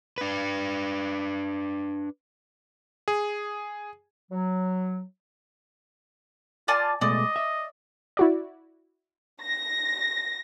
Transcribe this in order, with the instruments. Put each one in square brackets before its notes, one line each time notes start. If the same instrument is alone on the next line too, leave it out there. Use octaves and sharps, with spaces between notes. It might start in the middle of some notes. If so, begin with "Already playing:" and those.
[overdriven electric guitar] D4 B4
[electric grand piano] G#4
[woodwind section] F#3
[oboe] F4 [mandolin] D5 G#5 A5
[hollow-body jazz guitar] B2 G#3 A3 [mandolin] D5 [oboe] D#5
[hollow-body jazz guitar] E5
[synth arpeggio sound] E4 F#4 D5
[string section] A#6